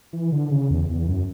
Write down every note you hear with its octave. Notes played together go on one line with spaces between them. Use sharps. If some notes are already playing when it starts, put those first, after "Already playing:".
E3
D3
C#3
E2
E2
F#2